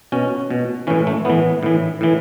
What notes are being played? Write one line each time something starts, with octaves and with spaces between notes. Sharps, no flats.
B2 C#4
B2
A2 E3 C#4
A3
A2 E3 B3
A2 E3
A2 E3